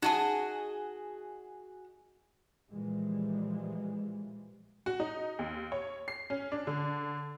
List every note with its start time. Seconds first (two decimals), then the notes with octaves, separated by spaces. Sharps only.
0.02 D#4 F#4 G#4 D#5 A5
2.71 A#2 E3 F3 G3 G#3
4.86 F#4
5.00 D#4
5.39 D#2
5.72 C#5
6.08 C7
6.30 C#4
6.52 D4
6.67 D3